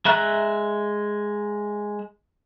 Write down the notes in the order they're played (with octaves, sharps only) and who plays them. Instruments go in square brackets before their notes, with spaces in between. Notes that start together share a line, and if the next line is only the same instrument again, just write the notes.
[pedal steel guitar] G#3 E5 A#5 F#6